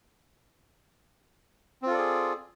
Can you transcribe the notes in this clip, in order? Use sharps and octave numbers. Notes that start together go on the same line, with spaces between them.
C4 F4 G#4 A4 D5